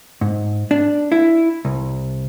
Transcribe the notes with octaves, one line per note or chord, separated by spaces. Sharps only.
G#2
D4
E4
C2